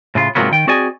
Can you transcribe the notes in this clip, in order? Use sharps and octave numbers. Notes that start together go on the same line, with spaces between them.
A2 C#3 F4
G#2 C3 F3 F#3 A#3 B3
D#3 G5
C4 F#4 G#4 D5 D#5 G#5